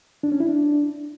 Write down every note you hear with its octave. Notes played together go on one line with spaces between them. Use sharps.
D4
C#4
E4
D4